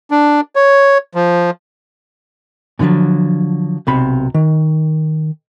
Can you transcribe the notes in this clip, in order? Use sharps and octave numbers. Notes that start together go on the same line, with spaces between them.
D4
C#5
F3
A#2 D3 D#3 F3 F#3
B1 C3 B5
D#3